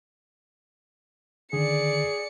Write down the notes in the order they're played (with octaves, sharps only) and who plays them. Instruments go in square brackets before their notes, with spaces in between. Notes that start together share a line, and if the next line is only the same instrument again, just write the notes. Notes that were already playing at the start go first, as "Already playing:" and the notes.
[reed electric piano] D3 D#3 [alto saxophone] G#4 [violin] D5 C#7